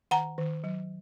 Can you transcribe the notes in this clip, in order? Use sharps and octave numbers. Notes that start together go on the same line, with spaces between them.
D#3 F#5 A#5
D#3
F#3